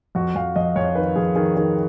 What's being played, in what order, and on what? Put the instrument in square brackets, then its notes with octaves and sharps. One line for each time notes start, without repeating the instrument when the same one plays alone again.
[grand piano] F2 F#4
F2 F5
F2 D#5
F2 C#5
D#3 B4
F2 G#4
D#3 G#4
D#3 G#4